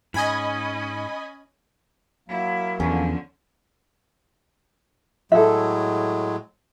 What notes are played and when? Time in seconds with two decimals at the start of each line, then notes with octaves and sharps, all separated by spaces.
0.14 G#2 C#4 D#5 G#5 B5
2.29 F#3 A#3 E4
2.80 E2 D3 F3 C#4
5.32 A2 F#3 G#3 A4 E5